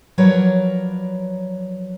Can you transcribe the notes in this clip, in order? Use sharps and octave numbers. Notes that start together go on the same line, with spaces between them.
F3 F#3 A#4 B4 C#5 D5